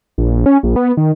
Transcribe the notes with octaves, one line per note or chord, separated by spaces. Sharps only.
A#1
C#4
A#1
B3
D#3